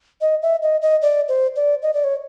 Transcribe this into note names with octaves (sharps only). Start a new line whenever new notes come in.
D#5
E5
D#5
D#5
D5
C5
D5
D#5
D5
C#5